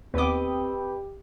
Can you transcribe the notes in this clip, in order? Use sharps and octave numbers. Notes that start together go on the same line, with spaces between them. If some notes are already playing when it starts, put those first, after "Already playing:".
D#2 B3 C4 G4 B4 D#5 D6